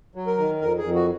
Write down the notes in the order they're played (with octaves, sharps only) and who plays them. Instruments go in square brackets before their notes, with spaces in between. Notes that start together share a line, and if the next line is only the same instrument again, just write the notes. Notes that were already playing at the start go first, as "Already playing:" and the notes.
[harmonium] F#3
A#4
D#3
F2 A#4
G#4
F2
F#4